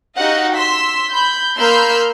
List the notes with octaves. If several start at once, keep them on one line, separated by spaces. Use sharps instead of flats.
D#4 F#4 G4 D#5 F5 F#5
C6 E6 B6
B5 G6
A#3 B5 C6 E6 F6 G6